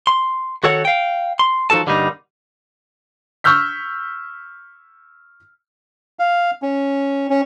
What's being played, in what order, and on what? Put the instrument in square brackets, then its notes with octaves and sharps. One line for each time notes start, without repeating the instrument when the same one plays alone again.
[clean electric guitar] C6
D#3 F#4 A4 C#5 F#5
F5 G5
C6
F3 D#4 F#4 A4 A5
G2 D3 G3 A#3 D#4
[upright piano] C#6 E6 F6 G6 B6
[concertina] F5
C#4
C#4